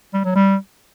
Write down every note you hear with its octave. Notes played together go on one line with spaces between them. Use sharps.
G3
F#3
G3